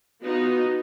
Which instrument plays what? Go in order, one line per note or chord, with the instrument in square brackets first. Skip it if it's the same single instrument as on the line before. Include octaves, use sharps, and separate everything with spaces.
[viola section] B3 D#4 F4 [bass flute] F#4